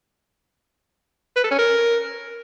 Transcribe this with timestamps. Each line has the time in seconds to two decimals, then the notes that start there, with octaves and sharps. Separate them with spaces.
1.36 B4
1.44 A4
1.51 C#4
1.59 A#4